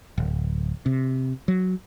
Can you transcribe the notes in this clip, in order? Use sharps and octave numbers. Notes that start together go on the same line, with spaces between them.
D1
C3
F#3